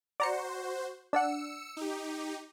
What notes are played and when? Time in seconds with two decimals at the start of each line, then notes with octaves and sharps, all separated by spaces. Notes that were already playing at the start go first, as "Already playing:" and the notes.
0.20 F#4 C5 D5 A#5 C#7
1.13 D4 D5 F#5 E6 C#7
1.77 D#4 G4